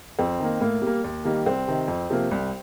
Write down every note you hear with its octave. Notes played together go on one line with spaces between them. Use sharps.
F2 C4
D#3 A#3
A2 A#3
G3 A#3
D#2
D#3 G3 A#3
C2 C4
C3 D#3
F2
C3 F3 A#3
C2